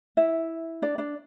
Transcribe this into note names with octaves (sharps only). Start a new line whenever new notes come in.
E4 E5
D4 D5
D4 D5